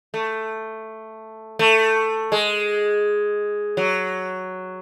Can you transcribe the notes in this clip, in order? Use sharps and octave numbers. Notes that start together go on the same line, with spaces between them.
A3
A3
G#3
F#3